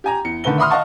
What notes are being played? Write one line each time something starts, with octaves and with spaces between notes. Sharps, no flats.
G4 G#5 A#5
E2 C#7
D3 D#3 A3 B4 G7
E5 F#5 B5 C6 D#6 F6
D#5 F5 F#5 A5 C#6